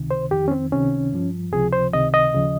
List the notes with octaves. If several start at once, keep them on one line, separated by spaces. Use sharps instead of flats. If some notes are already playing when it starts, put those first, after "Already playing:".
Already playing: C#2 C3 D#3
C5
F2 D#3 G4
C#4
C4
C#2 C3 D#3 C#4
G2 F3
C#2 C3 F3 G#4
C5
C#2 C3 D#3 D#5
D#5
D#2 C#3 F3